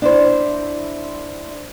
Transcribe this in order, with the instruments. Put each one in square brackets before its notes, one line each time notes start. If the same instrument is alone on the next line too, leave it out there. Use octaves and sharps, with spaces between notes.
[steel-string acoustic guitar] D4 E4 C5